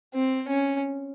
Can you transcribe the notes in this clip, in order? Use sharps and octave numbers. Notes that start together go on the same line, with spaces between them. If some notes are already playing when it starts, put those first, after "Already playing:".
C4
C#4